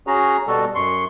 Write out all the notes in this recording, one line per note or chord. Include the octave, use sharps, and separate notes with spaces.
C#4 F#4 G#4 A#5
B2 G3 F#4 A4
F#2 C6 C#6